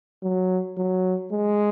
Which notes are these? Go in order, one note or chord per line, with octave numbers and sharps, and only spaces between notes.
F#3
F#3
G#3